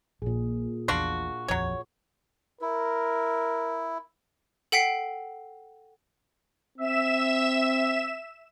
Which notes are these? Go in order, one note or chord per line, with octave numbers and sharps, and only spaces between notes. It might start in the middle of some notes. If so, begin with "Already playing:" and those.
A#1 A#2 G#4
A#1 E2 D4 F4 F#4
D#1 A#1 F2 F#3 C#5
E4 A#4
A4 F#5 G5 B6 C7
C4 E5 E7